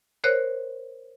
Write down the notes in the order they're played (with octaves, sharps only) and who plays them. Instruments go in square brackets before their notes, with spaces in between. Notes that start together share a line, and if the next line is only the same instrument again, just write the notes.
[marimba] A#4 C5 C#5 F#6